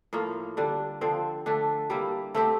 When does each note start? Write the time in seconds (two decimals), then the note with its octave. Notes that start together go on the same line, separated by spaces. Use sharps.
0.13 A2 F3 A#3 F4
0.57 D3 G3 D4
1.01 D3 F3 C4
1.46 D3 A3 D4
1.90 G3 A#3 E4 G4
2.35 A3 C4 G4